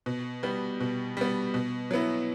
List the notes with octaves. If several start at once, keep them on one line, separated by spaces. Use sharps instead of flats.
B2
G3 B3
B2
G3 B3
B2
F#3 B3 E4